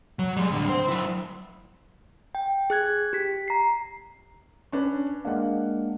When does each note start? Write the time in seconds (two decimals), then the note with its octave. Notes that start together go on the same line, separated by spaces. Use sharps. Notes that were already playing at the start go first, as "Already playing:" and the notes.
0.19 F#3
0.37 G3 G#3
0.52 A2 D3
0.69 C4 C5
0.88 F#3 E4
2.35 G5
2.70 G#4 F#6 G#6
3.13 G4 B6
3.48 A#5 C7
4.72 C#4 D4 B4
5.25 G#3 A#3 D4 F5 F#5